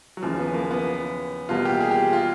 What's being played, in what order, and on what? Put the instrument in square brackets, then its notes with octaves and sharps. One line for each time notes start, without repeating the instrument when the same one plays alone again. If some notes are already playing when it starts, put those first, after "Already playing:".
[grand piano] F#3
[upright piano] D#2 C#3 E3 [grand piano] F3
[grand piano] B3
A#3
B3
[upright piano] E2 B2 G3 A#3 [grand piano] F4
[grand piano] G4
G#4
G4
F4